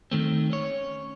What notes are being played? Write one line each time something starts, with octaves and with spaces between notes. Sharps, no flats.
D#3 A3 C4
C#4 C#5